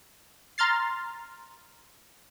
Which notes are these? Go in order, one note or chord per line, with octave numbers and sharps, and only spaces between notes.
A#5 C6 F6 A6 C7